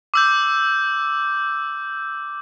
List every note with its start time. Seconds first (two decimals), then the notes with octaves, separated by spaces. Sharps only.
0.14 D6 E6 G6